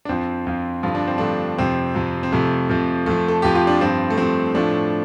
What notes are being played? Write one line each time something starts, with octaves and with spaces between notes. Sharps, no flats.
D4
F2 F3 C4
F2 F3
G2 D3 F3 F4
D4
C4
G2 D3 F3 A3 D4
F2 C3 F3 C4
F2 C3 F3
C4
F2 C3 F3 A3
F2 C3 F3
F2 F3 A3
A4
F2 F3 G4
F4
D4
G2 F3 C4
A3
G2 F3 C4
A2 F3 A3 D4